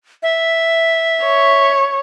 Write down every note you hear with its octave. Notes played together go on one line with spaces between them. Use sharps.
E5
C#5